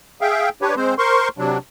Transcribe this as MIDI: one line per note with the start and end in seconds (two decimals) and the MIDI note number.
0.21 0.49 68
0.21 0.49 76
0.21 0.49 77
0.21 0.49 79
0.62 0.75 62
0.62 0.75 67
0.62 0.75 71
0.62 0.75 73
0.77 0.94 56
0.77 0.94 60
0.77 0.94 72
0.98 1.28 70
0.98 1.28 72
0.98 1.28 84
0.98 1.28 85
1.38 1.58 48
1.38 1.58 54
1.38 1.58 62